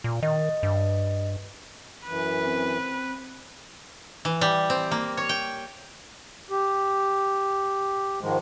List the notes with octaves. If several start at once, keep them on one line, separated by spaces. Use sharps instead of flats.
A#2
D#3 D#5
G2
F#2 E3 B4
C4
E3
G3
C4
A#3
C#5
G5
G4
G#2 D#3 F3 G#3